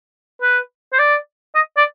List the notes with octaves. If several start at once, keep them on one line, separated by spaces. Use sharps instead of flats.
B4
C5
D5
D#5
D5